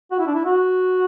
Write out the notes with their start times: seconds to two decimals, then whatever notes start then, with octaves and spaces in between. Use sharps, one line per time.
0.11 F#4
0.19 E4
0.27 D4
0.35 E4
0.45 F#4